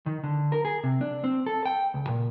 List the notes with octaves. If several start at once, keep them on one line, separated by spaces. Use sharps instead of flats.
D#3
D3
A#4
G#4
C3
D4
C4
A4
G5
C#2
A#2